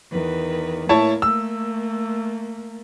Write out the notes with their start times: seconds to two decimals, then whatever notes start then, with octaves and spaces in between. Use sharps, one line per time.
0.11 E2 D#3 B4
0.89 A2 A#3 E4 C#5 A5
1.22 A3 A#3 E6